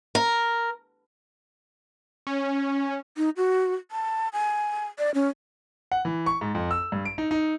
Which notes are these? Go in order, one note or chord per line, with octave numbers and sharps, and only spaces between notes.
A#4
C#4
D#4
F#4
A5
G#5
D5
C#4
F#5
E3
C#6
G#2
F2
E6
G2
D7
D#4
D#4